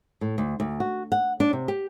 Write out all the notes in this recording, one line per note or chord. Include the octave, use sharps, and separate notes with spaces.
A2
D2
D2
F#4
F#5
D4
C3
G4